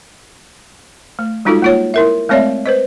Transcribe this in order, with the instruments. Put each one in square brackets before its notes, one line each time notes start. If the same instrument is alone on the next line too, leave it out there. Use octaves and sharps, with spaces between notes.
[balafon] A3
G3 G#3 D#4 F4 F#4 A4
A#3 F4 C#5
E4 A#4 E5
G#3 A3 C4 C#5 D5 E5
B4 C5 D#5